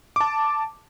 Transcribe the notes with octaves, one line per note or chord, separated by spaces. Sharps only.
A5 D6